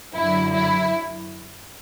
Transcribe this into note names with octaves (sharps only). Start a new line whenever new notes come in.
F#2 D3 F#3 E4
E4